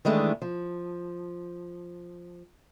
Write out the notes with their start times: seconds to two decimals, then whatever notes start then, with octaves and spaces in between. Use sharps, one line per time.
0.05 D#3 E3 G#3 A3 D4
0.42 F3